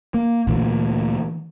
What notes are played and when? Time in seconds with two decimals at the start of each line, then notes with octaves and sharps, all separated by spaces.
0.14 A#3
0.47 D2 A#2 E3 G#3